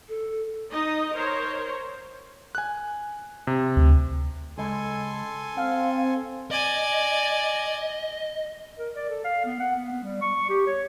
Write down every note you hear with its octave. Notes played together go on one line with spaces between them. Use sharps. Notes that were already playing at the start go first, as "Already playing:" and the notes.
A4
D#4 D#5
A#4 C5 C#5
G#5 F#6
C3
D2
C#2 G#3 A4 G#5 C6
C4 F5
D5 D#5 G#5
A#4
D5
A4
F5
B3
F#5
B3
B3
G3
C#6
G4
C#5